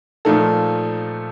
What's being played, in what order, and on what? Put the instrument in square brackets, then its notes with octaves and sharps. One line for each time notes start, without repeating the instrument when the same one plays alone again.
[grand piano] A#2 F3 A3 D#4 A4